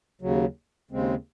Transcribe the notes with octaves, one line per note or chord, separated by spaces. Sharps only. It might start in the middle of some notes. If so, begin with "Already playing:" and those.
D#2 C#3 F#3
D#2 C#3 G#3 C4